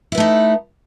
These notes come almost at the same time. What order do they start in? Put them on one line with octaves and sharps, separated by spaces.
E4 B3 A3 D#4